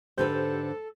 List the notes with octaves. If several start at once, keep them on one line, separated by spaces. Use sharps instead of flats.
G#2 D3 G4 A4 B4 C5 G6